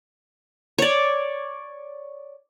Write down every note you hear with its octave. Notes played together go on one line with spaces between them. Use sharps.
C#5 D5